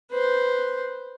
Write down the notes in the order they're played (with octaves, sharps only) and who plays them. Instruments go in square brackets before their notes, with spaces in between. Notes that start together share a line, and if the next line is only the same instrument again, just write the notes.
[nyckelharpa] B4 C5